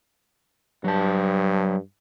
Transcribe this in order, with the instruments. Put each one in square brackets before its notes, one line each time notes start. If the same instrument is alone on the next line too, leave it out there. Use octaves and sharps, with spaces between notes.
[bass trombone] G2 [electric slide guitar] F#3 A5